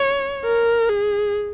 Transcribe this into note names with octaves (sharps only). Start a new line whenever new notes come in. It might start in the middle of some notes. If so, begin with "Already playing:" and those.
Already playing: C#5
A#4
G#4